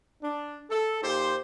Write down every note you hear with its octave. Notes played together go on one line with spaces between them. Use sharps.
D4
A4
A#2 D#4 G4 C5